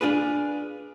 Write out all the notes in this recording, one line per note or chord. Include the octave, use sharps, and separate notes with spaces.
D4 F4 G#4 B4